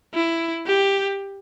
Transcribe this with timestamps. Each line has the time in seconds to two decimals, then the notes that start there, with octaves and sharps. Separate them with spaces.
0.14 E4
0.67 G4